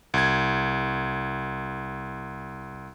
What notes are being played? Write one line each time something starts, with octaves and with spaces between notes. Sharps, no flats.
C2 G#6